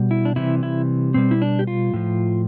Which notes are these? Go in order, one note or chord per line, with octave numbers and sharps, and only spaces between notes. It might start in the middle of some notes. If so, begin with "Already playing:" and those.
Already playing: B2 G3
E4
D4
C3 E3 G3 E4
E4
B2 G3 C4
E4
D4
G4
F4
A2 F3